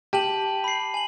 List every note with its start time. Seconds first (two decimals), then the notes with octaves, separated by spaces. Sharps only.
0.13 G4 A5 D#7 F#7
0.64 B5 C7
0.94 G#5 F#7